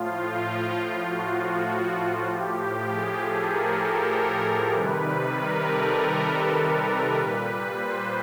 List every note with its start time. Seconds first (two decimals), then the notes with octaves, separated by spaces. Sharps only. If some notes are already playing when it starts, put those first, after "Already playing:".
Already playing: A2 F3 F4
1.07 F#4
2.29 A2 F3 G4
2.90 G#4
3.20 A4
3.51 A#4
4.72 C3 D#3 G3 B4
5.03 B4
5.34 A#4
5.65 A4
6.55 A#4
6.86 B4
7.16 A#2 G3 B4
7.78 C5